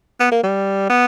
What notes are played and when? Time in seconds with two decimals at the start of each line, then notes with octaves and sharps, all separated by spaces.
0.20 B3
0.32 A#3
0.43 G3
0.89 B3